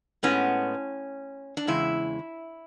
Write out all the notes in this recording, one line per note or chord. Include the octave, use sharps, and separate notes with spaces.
A2 G#3 B3 C#4
D4
E2 C#3 G#3 E4